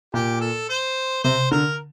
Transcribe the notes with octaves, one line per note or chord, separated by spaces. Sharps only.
A#2 G4
A4
C5
C3 C5
D3 A#4